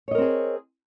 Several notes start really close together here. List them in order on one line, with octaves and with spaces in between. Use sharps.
C#5 D#5 A#4 C4 G#4